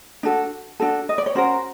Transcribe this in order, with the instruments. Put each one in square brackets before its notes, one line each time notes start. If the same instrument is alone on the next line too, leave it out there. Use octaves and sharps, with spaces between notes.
[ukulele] D4 F#4 A4
D4 F#4 A4
D#5
D5
C#5
C#4 F#4 A#4 C5